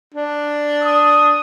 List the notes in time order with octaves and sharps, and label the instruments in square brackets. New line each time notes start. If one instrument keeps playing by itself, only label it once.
[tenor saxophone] D4
[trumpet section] D#6